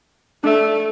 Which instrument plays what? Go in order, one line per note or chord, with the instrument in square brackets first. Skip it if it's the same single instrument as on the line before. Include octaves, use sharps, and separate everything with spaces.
[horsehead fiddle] A3 [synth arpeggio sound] D4 E5